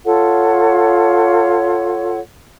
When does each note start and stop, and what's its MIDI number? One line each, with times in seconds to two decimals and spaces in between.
0.05 2.19 65
0.05 2.19 69
0.05 2.19 73
0.05 2.19 78